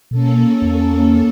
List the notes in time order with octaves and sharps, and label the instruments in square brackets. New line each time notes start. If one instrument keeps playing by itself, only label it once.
[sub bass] B2 [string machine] A#3 C#4 A4
[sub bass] E2